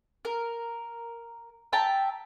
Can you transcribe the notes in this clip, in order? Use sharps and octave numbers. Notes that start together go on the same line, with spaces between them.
A#4
E5 G5 A5 A#5